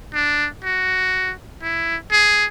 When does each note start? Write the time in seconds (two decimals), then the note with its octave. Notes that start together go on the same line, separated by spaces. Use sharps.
0.14 D4
0.64 F#4
1.62 E4
2.11 G#4